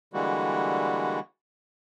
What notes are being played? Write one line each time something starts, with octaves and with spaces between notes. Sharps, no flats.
D3 E3 G3 G#3 A#3 F#4